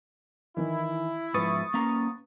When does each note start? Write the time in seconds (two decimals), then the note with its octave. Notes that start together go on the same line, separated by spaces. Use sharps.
0.57 D#3 E3 E4
1.34 G#2 E3 F3 B4 C#6 D#6 A6
1.74 A#3 C#4 A#5